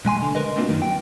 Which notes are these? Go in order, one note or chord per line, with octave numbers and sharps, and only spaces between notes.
B2 G#3 G#5 C6
D3
A#4 B4 D#5
A3 A#3 C4 D4 F4 F#4
F#2 D#3
G5